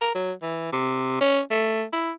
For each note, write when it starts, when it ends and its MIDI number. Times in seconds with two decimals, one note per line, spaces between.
0.02 0.11 70
0.15 0.32 54
0.42 0.69 52
0.72 1.19 48
1.21 1.40 61
1.51 1.84 57
1.93 2.11 64